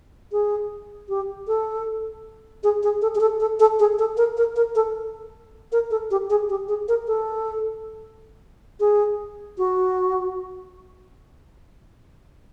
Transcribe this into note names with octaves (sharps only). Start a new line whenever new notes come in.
G#4
G4
A4
G#4
G#4
A4
G#4
A4
A4
A4
G#4
A4
A#4
A#4
A#4
A4
A#4
A4
G4
G#4
G4
G#4
A#4
A4
G#4
F#4